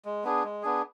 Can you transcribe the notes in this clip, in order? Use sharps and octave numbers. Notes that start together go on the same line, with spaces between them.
G#3
B3 D4 G#4
G#3
B3 D4 G#4